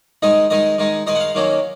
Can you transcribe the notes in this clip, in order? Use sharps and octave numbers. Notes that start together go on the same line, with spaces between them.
D#3 G#3 D#4 D#5
D#3 G#3 D#4 D#5
D#3 G#3 D#4
D#3 G#3 D#4 D#5
F#5
F5
D#3 F#3 A#3 C#4